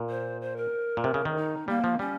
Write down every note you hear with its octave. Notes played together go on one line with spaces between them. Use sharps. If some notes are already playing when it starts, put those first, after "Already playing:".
Already playing: A#2
C5
C5
A#4
A#2
C3
C#3
D#3
D#4
G3 A#3
F3
G3 C#4